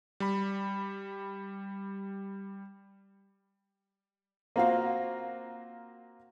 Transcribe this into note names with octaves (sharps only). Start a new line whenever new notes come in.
G3 B5
A#3 C4 F4 F#4 F5